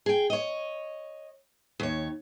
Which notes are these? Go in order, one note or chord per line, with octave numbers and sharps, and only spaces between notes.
G#4 G5
C#5 D#5
D#2 C#5